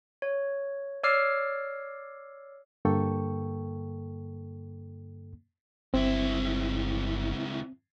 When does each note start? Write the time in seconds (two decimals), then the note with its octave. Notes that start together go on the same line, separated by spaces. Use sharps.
0.22 C#5
1.03 C#5 D5 D6 E6 F6 C7
2.85 G2 D3 A#3 A4 G5 C#6
5.94 G1 C#2 C4 E4